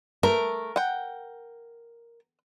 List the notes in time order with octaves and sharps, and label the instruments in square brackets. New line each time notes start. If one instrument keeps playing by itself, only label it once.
[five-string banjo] A3 [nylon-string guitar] A#4
[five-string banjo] F#5 G5